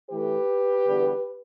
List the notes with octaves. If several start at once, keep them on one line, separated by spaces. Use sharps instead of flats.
A2 E3 A3 G4 B4
E2 D3 G3 B3